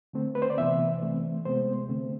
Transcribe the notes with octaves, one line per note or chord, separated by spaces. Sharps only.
D3 A3 C4
B4
C5
D5
C3 E3 B3 E5
E3 A3 C4
C3 G#3 B3 C5
D3 A3 C4